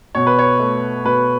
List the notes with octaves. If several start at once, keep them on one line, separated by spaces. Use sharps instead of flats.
B2 C#5
B4
C#5
A3
B2 B4